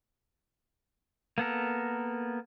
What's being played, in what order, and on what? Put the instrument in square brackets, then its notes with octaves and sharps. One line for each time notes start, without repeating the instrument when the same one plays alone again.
[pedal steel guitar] A#3 B3 A4 A#4